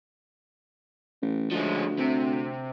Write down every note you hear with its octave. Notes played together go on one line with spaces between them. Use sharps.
A1
D2 F3 G#3
C3